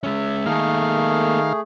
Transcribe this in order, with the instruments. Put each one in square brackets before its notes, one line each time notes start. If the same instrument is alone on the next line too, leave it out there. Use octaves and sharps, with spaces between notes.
[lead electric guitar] G#3 C#4 [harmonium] E5
[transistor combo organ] D#3 F5 [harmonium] A3 G#4 [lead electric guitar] A#3 A4